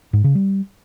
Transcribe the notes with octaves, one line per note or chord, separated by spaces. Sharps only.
G#2
C#3
G3